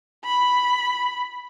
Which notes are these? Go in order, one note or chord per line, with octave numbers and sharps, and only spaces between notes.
B5